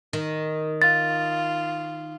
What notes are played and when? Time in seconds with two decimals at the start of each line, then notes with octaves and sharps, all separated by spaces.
0.13 D#3
0.82 F4 A6